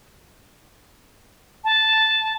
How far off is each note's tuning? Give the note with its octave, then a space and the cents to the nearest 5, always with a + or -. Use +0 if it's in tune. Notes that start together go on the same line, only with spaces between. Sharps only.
A5 -5